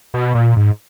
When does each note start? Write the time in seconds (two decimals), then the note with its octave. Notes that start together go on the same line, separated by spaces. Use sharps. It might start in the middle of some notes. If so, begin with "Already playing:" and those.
0.14 B2
0.35 A#2
0.57 G#2